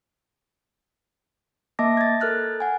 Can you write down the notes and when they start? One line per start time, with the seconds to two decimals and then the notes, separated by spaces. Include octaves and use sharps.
1.79 A#3 D#5 E5 A5 D6 A#6
1.97 G#6 A6
2.20 A4 A#4 F6 F#6 A6
2.60 F#5 G#5